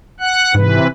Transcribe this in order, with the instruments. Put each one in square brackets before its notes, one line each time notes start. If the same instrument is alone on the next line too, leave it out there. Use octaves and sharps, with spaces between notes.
[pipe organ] F#5 F#6
[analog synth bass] G#2 [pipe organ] C3 E3 B4